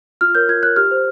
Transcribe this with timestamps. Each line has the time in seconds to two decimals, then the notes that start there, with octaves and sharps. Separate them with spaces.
0.21 F4 F6
0.35 A#4 C#5 G6
0.49 F4 G#6
0.63 A#4 C#5 F#6
0.76 G4 F6
0.91 C5